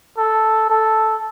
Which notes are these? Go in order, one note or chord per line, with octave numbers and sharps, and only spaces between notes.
A4
A4